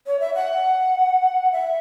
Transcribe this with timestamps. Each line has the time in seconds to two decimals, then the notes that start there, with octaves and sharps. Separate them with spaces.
0.07 C#5
0.20 E5
0.35 F#5
1.52 E5